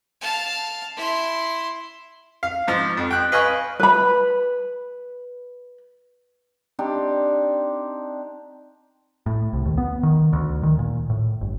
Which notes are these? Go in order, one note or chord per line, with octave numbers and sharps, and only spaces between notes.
F5 A5
E4 C6
F5
G#2 F3
F2
G5 F#6
B4 D#5 F5 G#5 B5 C#6
B4 B5
C4 D4 D#4 G4
A2
C2
D#2
B3
D#3
D2
D#3
A#2
A2
G1